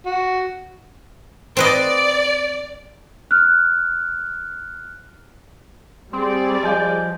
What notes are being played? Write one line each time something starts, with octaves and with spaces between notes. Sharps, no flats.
F#4
C4 B4 D5 D#5
F6 F#6
G3 C4 G#4 D5 C6
F3 D#5 G#5 G6